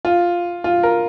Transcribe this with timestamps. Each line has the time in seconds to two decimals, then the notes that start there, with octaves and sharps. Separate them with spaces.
0.05 F4
0.64 F4
0.83 A#4